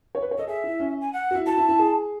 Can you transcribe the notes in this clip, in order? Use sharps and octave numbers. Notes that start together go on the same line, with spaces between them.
C#5
B4
C#5
A4 D#5
G#4 E5
E4
C#4
G#5
F#5
F#4
E4
F#4 A5
E4
E4
G#4